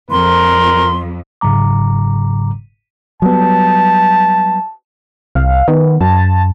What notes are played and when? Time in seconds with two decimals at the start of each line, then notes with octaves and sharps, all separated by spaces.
0.11 F2 A#4 C6
1.41 G1 G#2 C#3 F#3 A#5 D6
3.22 F#3 G3 B3 A5
5.35 C2 F5
5.68 D#3 B3
6.01 F#2 A5